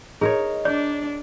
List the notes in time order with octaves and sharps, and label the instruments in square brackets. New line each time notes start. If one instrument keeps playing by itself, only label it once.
[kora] D#4 A#4 C#5 [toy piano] G#4
[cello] D4 [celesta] D5